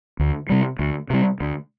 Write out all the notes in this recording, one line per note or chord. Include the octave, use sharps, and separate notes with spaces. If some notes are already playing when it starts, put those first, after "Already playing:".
D2
C3 G3
D2
C3 G3
D2